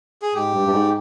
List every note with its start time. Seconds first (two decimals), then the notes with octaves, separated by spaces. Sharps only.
0.22 G#4
0.34 G#2 G4
0.54 G2
0.67 G2
0.73 G#2